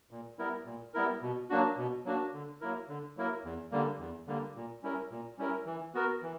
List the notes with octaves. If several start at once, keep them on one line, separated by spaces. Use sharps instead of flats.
A#2
G3 B3 E4 A#4
A#2
G3 B3 E4 A#4
B2
F#3 A#3 D4 F#4
B2
F#3 A#3 D4 F#4
D3
F#3 A#3 E4 A#4
D3
F#3 A#3 E4 A#4
E2
D3 G3 A#3
E2
D3 G3 A#3
A#2
G3 C#4 E4 A#4
A#2
G3 C#4 E4 A#4
E3
B3 F#4 A#4
E3